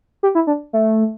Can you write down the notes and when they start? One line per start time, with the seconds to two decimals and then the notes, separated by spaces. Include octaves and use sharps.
0.23 G4
0.35 E4
0.47 D4
0.73 A3